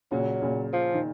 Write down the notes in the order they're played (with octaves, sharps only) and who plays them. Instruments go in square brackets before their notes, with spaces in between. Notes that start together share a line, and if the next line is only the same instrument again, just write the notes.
[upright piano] A#2 C#3 [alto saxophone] F#3
[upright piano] A#2 C#3
[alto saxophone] F3
[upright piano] D#3